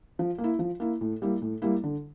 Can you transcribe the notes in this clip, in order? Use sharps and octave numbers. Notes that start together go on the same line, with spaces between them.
F3
A#3
E4
F3
A#3 E4
A2
G3 A#3 E4
A2
G3 A#3 E4
D3